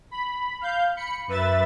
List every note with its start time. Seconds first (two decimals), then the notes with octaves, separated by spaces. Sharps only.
0.11 B5
0.61 F5 G6
0.97 B5 C#7
1.27 F#2 B4 E5 A6